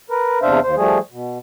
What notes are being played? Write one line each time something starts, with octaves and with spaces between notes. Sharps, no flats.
A#4 B4
E2 C3 D4 C5 E5 F5
D#2 C5
F3 G3 A3 G#4
B2